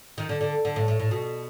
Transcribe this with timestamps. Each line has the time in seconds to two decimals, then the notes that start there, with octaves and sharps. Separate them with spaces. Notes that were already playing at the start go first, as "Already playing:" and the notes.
0.18 D#3
0.29 D3
0.41 D3
0.65 D3
0.76 A2
0.88 A2
1.00 A2
1.11 B2